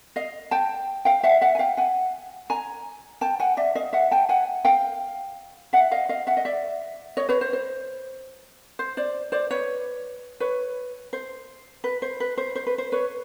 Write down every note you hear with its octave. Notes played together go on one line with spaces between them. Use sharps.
D#5 F5
G5 A5
F5 G5
E5 F#5
E5 F#5
G#5
F5 G5
F#5 G#5
G#5 A#5
G5 A5
F#5 G#5
D5 E5
D#5 F5
E5 F#5
G5 A5
F#5 G#5
F5 G5
E5 F#5
D#5 F5
D#5 F5
E5 F#5
D#5
D5 E5
C#5 D#5
B4 C#5
C5
C5
C5
C5 D5
C5 D5
B4 C#5
B4 C#5
C5
B4
C5
B4
C5
C5
B4
C5
B4 C#5